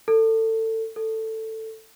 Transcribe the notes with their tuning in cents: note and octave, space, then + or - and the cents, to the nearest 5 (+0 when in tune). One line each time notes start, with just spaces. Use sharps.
A4 +25
A4 +10